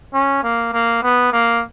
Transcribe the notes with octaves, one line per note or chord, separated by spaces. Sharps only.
C#4
A#3
A#3
B3
A#3